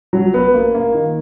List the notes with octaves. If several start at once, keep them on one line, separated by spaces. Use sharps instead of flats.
F#3
B3
A#3
A#3
D#3